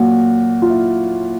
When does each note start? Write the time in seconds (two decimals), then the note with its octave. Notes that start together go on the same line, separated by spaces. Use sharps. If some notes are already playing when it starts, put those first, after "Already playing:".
Already playing: A#2 F#3 F#4
0.62 F4
0.70 E4